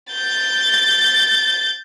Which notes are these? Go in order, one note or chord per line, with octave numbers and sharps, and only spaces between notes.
G6 A6